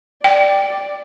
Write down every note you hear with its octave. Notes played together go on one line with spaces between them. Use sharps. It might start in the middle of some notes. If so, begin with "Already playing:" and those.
D5 G5